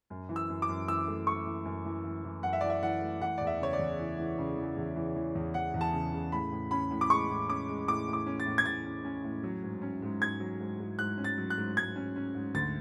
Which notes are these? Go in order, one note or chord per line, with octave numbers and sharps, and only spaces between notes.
F#2
E3
E6
F#2
D6
F#2
E3 E6
A3
A3 C#6
E3
F#2
E3
E3
E3
F#2 F#5
E5
E3 D5
E5
E3 F#5
A3
E3 F#5
E2 D5
E5
C#3 C#5
D5
E2
E3
E3
C#3
E3
E2
E3
E3
E2
E2 F#5
E2
A5
C#3
C#3
A2 B5
A2
C#4 B5
A2
D6
G#3 C#6
A2
C#4 D6
G#3
A2 D6
A2
D6
C#4
A6
A2
G#6
A2 A6
C#4
C#4
A2
F#3
G#2
C#4
G#2
G#2 G#6
F#3
G#2
G#2
G#2 F#6
C#4
A6
F#3
F#6
G#2
G#2 G#6
C#4
C#4
G#2
D2 A6